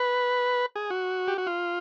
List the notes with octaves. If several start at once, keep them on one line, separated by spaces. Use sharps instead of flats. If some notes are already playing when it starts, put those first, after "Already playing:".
Already playing: B4
G#4
F#4
G4
F#4
F4